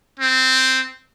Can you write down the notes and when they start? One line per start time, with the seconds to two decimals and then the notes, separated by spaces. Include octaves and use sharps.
0.19 C4